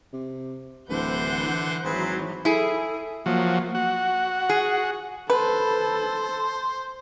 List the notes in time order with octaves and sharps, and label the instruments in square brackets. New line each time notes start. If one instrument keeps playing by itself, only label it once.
[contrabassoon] C3
[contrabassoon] D1 [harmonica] D3 C5 [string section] E3 F#5 G6
[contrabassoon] G#1 [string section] E3 F#3 [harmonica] C4 G#4 B4
[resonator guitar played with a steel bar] E4 G#4 [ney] A4
[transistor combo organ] F3 F#3 [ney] A#3
[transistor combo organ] F#4 [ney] F#5
[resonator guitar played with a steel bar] G#4
[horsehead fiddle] A4 [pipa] B4 [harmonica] C5